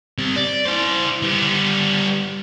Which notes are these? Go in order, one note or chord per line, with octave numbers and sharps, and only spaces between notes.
G3 C4
D5
E4 C5
G3 B3